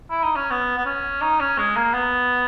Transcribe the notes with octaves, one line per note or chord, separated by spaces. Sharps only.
E4
D#4
C#4
B3
B3
C#4
D#4
C#4
G#3
A#3
B3